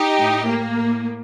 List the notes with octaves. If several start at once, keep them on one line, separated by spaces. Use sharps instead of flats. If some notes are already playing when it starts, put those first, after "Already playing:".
Already playing: D#4 G4
A2
A#3
A2